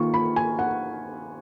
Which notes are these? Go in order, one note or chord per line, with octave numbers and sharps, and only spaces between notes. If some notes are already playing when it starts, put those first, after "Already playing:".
Already playing: D#3 A#3 F4 C#6
B5
G#5
F#5